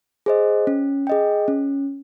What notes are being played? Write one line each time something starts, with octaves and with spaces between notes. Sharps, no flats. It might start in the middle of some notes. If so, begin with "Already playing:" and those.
G#4 C5 D#5
C#4
G#4 D#5 G5
C#4